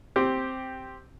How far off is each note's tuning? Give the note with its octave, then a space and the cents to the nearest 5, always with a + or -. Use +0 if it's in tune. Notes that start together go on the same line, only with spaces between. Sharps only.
C4 +0 G4 +0